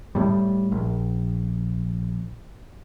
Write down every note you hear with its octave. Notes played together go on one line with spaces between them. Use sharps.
A2 G3
A#1